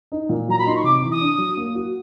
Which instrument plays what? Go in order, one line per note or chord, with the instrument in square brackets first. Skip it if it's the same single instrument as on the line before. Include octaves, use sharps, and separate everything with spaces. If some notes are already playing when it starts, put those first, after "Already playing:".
[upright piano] D#4
A#2
[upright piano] F#3 [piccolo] A#5
[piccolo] B5
[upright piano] D#4 [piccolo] C6
[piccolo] C#6
[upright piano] C3 [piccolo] D6
[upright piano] E3
[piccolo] D#6
[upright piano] D4
F#3
A#3
F#4